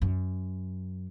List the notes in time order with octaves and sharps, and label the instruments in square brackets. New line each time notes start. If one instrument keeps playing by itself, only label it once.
[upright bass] F#2